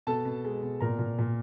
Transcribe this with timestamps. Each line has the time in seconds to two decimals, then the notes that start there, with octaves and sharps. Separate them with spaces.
0.07 B2 A4 A5
0.25 B2
0.45 G#3
0.62 B2
0.80 A#2 A#4 A#5
0.99 A#2
1.19 A#2